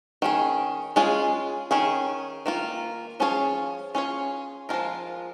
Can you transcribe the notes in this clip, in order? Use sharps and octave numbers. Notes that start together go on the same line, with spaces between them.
D#3 C#4 G#4
G#3 C#4 F4 G#4
D#3 C#4 G#4
D#3 A#3 F4
F3 C#4 F4 G#4 C#5
C#4 F4 G#4 C#5
F3 G#3 C#4 F4 A#4